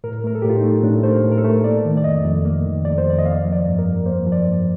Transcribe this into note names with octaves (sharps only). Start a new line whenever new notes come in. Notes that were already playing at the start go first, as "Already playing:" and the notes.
A2 A#4
A3 A#4
A4
A2 G4
F4
D#4
A3
A2 D4
A3 C5
A#4
A2
A#4
A4
A3
A#3 D5
D#3
D5
F2 D#5
F2
A#3
D#3
F2 D5
C5
F2 D5
D#5
A#3 F5
F3
D5
G2
A#4
G2
A#3 C5
F3
D5
G2